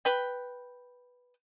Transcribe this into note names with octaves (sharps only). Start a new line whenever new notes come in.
B4 G5